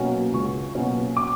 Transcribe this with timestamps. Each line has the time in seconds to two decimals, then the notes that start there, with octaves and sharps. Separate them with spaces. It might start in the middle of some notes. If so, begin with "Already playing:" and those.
Already playing: B2 F#3 A#3 C#4
0.33 C#2 C#6
0.75 B2 F#3 A#3 C#4
1.17 D6